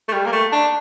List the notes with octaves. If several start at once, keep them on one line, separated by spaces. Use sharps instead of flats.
A3
G3
A#3
A3
D4